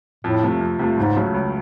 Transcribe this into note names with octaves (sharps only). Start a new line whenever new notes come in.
F2 A2
C3 F3 A3
F2
C3 F3 A3
C#2 G#2
C#3 F#3 A3
C#2